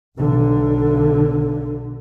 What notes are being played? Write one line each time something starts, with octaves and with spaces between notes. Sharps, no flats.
B1 D3